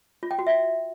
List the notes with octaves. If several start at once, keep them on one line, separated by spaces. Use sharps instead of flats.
F4
G5
F#4
E5